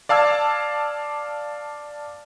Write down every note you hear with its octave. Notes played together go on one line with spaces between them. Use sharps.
D5 F5 A5 E6 G#6